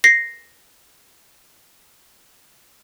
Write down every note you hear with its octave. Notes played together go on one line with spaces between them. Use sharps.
A#6 C7